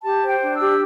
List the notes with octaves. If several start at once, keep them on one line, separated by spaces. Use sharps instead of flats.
G4 A5
C5
G5
D4
E6
G4